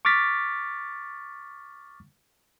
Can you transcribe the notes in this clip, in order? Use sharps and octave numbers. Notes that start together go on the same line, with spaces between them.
C#6 D6 F6 A6 B6